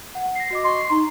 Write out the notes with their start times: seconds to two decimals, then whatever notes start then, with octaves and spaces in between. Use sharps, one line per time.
0.15 F#5
0.35 A#6 C7
0.51 F#4 D#5 D6
0.64 D#5 C6 C#6
0.91 D#4 A#5